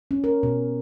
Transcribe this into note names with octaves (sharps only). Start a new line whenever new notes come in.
C#4
A#4
B2